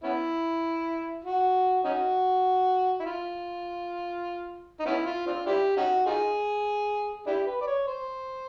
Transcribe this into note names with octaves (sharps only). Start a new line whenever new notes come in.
B3 C#4 E4
F#4
C#4 D#4 F#4
E4
F4
D#4
B3 C#4 E4
F4
C4 D4 F4
D4 E4 G4
C#4 D#4 F#4
D#4 F4 G#4
D4 E4 G4
B4
D5
C#5
C5